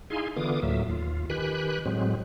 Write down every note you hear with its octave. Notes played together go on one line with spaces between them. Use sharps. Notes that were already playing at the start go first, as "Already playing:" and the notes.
D#4 E4 G#4 F5 G#5 C6
D3 E3 B3 F4 D6 D#6
D2 A2 F#3 A#3 E5
D#2 F4
D#3 G4 B4 G#5 B5 F#6
A2 F#3 G#3 C4